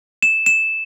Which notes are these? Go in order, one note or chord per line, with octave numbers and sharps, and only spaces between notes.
E7
E7